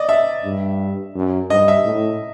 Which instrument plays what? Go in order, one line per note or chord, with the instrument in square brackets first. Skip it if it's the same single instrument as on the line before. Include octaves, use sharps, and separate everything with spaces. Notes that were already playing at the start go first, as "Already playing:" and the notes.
Already playing: [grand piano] D5 D#5
E5
[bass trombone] G2
F#2
[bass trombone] G2 [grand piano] D#5
[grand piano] E5
[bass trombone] A2